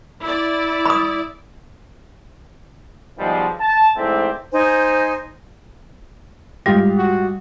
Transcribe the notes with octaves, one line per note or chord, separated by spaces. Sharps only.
E4 D5
B5 D#6
B2 D#3 F3 G3 G#3
A5
G#2 E3 A3 C4 D5 E5
D#4 C5 G#5
G#2 G3 F4 G4
F#4